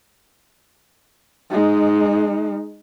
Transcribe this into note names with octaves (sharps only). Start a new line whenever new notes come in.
G#3 D#4